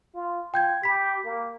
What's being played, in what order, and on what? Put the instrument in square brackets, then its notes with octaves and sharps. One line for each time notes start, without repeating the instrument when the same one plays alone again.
[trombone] F4
[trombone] F4 [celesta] G5 G6 G#6
[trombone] G4 [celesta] B5 B6
[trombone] A#3